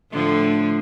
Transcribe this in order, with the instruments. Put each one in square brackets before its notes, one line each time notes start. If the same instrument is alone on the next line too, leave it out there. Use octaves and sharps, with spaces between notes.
[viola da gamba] A2 D3 F3